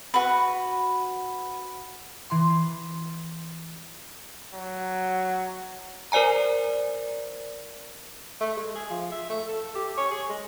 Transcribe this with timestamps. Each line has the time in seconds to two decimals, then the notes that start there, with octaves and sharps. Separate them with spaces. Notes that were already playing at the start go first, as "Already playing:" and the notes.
0.14 F#4 B4
2.30 E3 C6
4.54 F#3
6.12 A#4 C5 D5 G#5 A#5
8.41 A3
8.57 G#3
8.75 G#4
8.90 F3
9.12 E5
9.30 A3
9.49 A4
9.75 G4
9.97 C#5
10.11 G#4
10.29 G#3